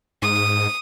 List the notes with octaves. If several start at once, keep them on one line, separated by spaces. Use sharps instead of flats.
G#2 D#6